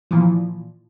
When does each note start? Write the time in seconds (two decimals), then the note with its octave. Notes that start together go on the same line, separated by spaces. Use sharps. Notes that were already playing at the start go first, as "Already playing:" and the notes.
0.11 A#2 E3 F3